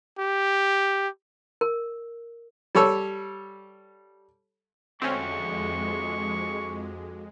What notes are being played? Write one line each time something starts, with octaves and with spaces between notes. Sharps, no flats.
G4
A#4
G3 A4 C#5 E6
F2 G#3 C4 C#4 F#4 A4 E5 C#6